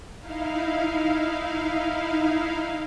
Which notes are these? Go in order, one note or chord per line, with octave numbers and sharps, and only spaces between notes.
D#4 E4 F5